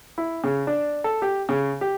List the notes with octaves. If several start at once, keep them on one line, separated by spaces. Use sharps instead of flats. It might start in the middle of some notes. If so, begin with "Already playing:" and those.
E4
C#3
D4
A4
G4
C#3
G4